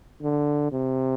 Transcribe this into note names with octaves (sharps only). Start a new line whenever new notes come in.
D3
C3